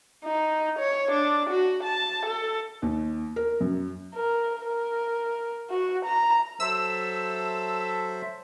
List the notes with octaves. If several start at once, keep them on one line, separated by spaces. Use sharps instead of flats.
D#4
C#5
D4
F#4
A5
A4
D#2
A#4
F#2
A#4
A#4
F#4
A#5
F#3 A4 C5 E5 E6